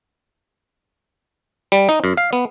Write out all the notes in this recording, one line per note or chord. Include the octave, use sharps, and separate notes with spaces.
G3
D#4
F#2
F5
B3